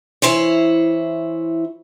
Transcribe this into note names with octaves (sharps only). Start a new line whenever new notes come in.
E3 E4 C5 C#5